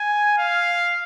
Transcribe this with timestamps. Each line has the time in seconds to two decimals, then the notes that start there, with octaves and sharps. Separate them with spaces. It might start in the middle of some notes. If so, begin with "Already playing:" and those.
Already playing: G#5
0.38 F5